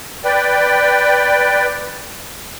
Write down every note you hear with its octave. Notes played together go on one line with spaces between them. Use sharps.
B4 D5 G5